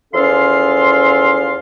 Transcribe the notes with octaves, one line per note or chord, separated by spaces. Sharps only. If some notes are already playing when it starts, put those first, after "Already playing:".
E2 F3 C#4 A4 F5 C6